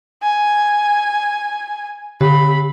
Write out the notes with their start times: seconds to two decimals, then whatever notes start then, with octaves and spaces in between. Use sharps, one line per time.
0.22 G#5
2.21 D3 G4 B5